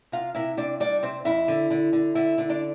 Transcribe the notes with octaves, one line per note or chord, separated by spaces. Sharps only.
C3 F4 F5
C3 E4 E5
C3 D4 D5
G3 D4 D5
C3 C4 C5
F2 E4 E5
D3
D3
D3
D3 E4 E5
D3
D4 D5